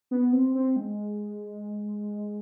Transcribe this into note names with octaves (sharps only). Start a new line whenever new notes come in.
B3
C4
C4
G#3